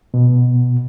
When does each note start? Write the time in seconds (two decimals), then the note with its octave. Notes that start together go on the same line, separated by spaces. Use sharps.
0.14 B2